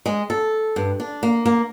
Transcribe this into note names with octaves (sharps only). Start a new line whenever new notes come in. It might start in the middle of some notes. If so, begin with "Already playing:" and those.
G#3
A4
G2
D4
A#3
A#3